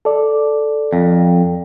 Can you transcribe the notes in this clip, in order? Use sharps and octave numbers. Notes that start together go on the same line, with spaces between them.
A4 D5
F2